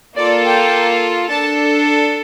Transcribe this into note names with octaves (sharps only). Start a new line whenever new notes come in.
A#3 F4 A4 D5
G5
D4 A4 A5